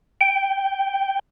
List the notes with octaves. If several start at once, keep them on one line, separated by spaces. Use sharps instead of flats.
G5